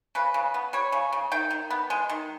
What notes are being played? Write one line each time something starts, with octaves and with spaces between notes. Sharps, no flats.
C#3 B4
C#3
B3
G3 C#5
C#3
C#3
D#3 G5
D#3
B3
G#3
D#3